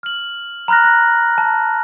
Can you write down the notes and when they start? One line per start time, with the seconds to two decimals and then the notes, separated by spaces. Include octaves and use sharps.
0.03 F6 F#7
0.68 A#5 B5 F6 F#6 A#6
0.84 F#6 A#6
1.38 A5